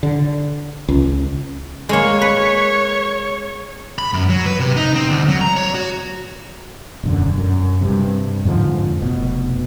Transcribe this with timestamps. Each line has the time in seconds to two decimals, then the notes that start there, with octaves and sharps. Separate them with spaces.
0.03 D3
0.88 C#2
1.89 G#3 A#3 C#5
2.22 B4
3.98 B5
4.13 F#2
4.29 F#3
4.46 B4
4.60 C3
4.76 D#4
4.96 C4
5.10 D2
5.28 F#3
5.41 A#5
5.56 C#5
5.74 F#4
7.03 E1 F#2 D3
7.38 F#2
7.81 G2 C3
8.45 F2 G#2 D3 F3
9.02 F1 B2